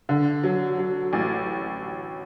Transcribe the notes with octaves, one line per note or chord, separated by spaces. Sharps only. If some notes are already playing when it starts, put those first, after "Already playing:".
D3
F#3
F#3
A1